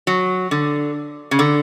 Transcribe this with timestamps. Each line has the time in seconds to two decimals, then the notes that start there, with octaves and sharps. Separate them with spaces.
0.07 F#3
0.51 D3
1.31 C#3
1.39 D3